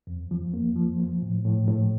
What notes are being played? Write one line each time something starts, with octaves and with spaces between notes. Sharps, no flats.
F2
F3
A#3
F3
F3
A2
A2
A2